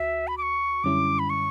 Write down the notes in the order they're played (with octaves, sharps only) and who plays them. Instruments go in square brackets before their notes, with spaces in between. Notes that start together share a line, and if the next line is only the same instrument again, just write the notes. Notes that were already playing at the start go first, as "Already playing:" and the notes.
Already playing: [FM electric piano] D2 F#4 [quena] E5
[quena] B5
D6
C#6
[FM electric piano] F#2 D3 G3 C#4 E4 [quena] D6
[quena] B5
C#6